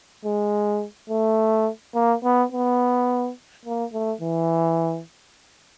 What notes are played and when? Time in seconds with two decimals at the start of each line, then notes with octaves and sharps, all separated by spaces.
0.25 G#3
1.10 A3
1.95 A#3
2.24 B3
2.52 B3
3.65 A#3
3.93 A3
4.21 E3